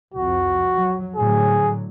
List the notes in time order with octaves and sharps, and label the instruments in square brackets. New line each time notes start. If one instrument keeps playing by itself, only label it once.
[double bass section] C2 F2 [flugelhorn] F#4
[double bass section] F#3
[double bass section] A2 D3 F#3 [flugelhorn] G#4